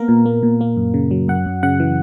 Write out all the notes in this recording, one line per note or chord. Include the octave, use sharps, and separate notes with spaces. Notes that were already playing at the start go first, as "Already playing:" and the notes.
Already playing: A#3 B3 A#4
A#2
A#3
A#2
A#3
F#2
C#3
F#3
F#2 F#5
F#2
C#3 F#5
E3